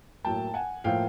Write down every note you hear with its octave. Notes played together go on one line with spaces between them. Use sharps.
A2 F#3 A#3 G5 A5
F#5 G#5
A2 F3 A#3 F5 G5